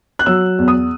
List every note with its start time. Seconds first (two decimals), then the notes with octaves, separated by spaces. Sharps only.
0.19 F#6
0.26 F#3 E6
0.58 E2
0.68 D#6